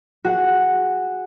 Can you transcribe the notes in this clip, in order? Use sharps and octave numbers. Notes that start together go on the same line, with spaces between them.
F#4 G#4 F#5